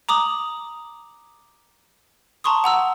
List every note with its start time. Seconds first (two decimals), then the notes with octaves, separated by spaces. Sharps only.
0.09 A#5 D6 D#6 F#7
2.44 A5 A#5 C6 C#6 D#6
2.64 F#5 A#5 E6